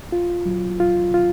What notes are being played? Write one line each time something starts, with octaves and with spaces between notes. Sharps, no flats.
F4
F#3
F4
F4